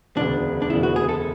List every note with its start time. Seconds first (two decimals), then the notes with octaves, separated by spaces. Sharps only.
0.16 E1 D2 C#3 G#3 B3 D4
0.62 D4
0.70 E1 D2 C#3 G#3 B3 E4
0.83 F#4
0.96 G#4
1.09 A4